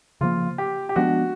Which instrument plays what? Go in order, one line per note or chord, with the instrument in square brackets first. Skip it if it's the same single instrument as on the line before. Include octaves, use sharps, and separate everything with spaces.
[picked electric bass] C#3 F3 A#3 [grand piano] F4
[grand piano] G4
G4
[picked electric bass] F3 G#3 B3 D4 [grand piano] F#4